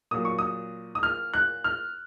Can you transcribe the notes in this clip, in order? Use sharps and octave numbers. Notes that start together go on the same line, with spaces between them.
A#2 F#3 D#6
C#6
D#6
D#6
F6
F#6
F6